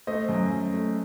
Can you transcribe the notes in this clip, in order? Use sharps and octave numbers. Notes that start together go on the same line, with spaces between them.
A3 C5 D#5
F#2
F#2
A3